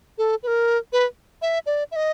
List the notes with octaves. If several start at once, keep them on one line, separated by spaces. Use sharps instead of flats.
A4
B4
A#4
B4
E5
D5
E5
D#5